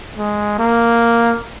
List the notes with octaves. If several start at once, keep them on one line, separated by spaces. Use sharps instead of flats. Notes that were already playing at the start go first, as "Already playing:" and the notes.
G#3
A#3